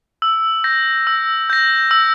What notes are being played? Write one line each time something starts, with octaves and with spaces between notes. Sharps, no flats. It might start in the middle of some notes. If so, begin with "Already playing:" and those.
E6
G6 A#6
E6
G6 A#6
E6